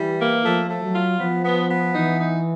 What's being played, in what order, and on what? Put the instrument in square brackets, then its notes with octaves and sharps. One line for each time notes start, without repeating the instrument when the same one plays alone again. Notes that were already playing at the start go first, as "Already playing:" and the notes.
Already playing: [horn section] E3 [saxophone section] G3
[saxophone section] A#3
[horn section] F3 [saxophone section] A3
[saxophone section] A3
[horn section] F#3
[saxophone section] F4
[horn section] F3 [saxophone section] B3
[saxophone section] B3
B3
[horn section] E3 [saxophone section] D#4
[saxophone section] D#4